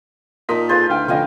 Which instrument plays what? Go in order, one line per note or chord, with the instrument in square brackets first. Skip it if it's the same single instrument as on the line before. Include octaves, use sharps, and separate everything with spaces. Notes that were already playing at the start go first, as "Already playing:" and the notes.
[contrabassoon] A#2 [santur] D#4 A5 C6 [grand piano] A#4 D#6 B6
[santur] F4 B4 C5 [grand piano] G#4 A4 [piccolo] A6
[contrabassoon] D2 [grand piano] E4 F5 G5 [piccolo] F6
[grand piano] D3 C#4 D#5 [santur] F3 F5 G#5 [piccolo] G5